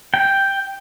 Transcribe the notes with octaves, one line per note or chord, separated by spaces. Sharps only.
G5